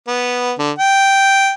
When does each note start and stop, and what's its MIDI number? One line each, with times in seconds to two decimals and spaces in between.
0.07 0.53 59
0.59 0.71 50
0.79 1.52 79